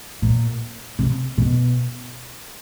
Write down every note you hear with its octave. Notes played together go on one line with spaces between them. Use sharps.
A#2
C3
B2